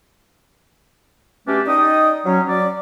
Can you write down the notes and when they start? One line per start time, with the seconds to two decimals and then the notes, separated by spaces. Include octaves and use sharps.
1.48 B2 A3 C#4 D4 G4
1.67 D#4 D5 D#5 G5 D#6
2.26 F#3 C#4
2.48 F#3 D5